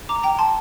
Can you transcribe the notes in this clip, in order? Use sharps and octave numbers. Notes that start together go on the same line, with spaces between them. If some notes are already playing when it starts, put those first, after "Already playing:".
A#5 D6
G5 A#5
A5 C6